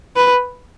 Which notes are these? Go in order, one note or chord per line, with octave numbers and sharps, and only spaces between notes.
B4